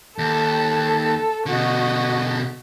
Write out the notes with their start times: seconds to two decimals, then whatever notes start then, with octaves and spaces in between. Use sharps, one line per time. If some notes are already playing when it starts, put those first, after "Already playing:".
0.18 D#2 A4
1.46 B2 D3 F#4 D#5